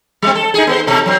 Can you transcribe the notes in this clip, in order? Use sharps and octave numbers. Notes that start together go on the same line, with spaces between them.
G3 C4
A4
D#4 G#4
B3 A4 C5
B2 A4
F#3 C4